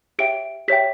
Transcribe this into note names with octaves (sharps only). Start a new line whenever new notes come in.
G4 C#5 E5 G5 D7
G4 C#5 E5 G5 B6